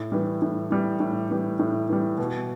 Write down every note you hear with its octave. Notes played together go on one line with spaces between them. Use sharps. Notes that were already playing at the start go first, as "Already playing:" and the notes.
Already playing: A2
E3 G3
A2
E3 G3
A2
E3 G3
A2
E3 G3
B2